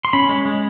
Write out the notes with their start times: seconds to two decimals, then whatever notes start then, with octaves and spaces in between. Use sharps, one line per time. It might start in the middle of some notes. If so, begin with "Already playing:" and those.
0.05 C6
0.13 C#4 B5
0.29 G#3
0.46 G#3